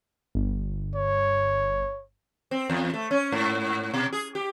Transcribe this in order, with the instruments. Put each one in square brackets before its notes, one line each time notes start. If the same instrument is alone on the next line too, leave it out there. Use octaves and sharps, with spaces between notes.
[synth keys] G1
[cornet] C#5
[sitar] C4
E2
A3
C#4
G#2
B2
G#4
G4